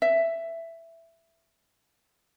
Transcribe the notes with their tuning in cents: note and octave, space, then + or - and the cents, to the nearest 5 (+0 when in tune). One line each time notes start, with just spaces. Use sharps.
E5 +10